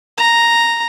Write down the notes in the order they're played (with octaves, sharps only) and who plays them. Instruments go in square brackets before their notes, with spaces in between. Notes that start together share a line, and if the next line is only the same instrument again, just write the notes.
[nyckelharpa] A#5